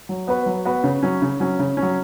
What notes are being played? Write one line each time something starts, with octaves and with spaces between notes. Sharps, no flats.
F#3
B3 F#4 B4
F#3
B3 F#4 B4
C#3
F#3 C#4
C#3
F#3 C#4
C#3
C#4
F#3